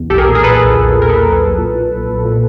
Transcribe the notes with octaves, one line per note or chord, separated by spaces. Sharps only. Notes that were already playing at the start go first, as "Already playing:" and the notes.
Already playing: E2
B1 G4 A4
G#4 A#4
A#2
G#4 A#4
A#2 A4 B4
B1
B1
A#2
A#4
A#2 A4 B4
B1
B1
A#2
A#2
B1
B1
A#2